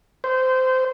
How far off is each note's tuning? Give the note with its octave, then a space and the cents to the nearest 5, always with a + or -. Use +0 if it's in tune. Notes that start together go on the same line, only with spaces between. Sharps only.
C5 -20